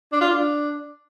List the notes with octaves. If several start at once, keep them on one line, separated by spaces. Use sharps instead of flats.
D4
F4
D4